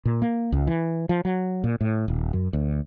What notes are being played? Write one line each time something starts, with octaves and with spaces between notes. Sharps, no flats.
A#2
A#3
C#2
E3
F3
F#3
A#2
A2
D#1
F#2
D2